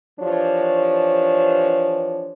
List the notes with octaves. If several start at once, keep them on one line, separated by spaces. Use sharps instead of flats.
E3 F3 D4 G4 C#5